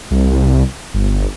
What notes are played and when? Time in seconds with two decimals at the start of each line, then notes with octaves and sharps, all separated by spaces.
0.11 C2
0.94 G1